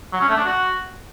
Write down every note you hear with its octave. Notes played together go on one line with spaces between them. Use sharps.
F#3
C#4
A3
D4
F#4